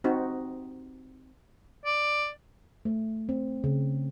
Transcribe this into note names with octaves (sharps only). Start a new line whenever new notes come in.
C4 D#4 F#4
D5
A3
C4
C#3